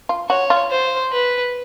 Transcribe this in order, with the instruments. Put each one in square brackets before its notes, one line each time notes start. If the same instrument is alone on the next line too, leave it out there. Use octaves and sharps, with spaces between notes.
[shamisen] F4
[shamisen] F#4 [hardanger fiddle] C#5
[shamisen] F4
[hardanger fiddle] C5
B4